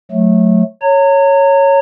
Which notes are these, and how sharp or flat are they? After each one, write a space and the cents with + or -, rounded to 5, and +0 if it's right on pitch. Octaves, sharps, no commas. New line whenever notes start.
F#3 -20 A3 -10
C#5 +0 A#5 -35